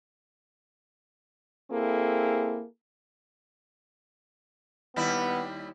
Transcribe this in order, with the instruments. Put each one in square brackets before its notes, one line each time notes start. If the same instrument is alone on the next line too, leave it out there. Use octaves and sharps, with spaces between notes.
[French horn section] A#3 C4 E4 G#4 A4
[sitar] D#2 G3 E4 [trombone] B3